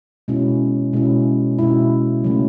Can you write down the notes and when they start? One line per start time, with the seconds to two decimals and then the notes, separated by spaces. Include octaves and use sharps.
0.28 B2 G#3 C#4 E4
0.93 B2 G#3 C#4 E4
1.59 B2 G#3 C#4 E4
2.24 C#3 F#3 A3 C#4